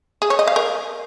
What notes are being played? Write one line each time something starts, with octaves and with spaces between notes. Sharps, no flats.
G#4
C#5
D#5
F5
A#4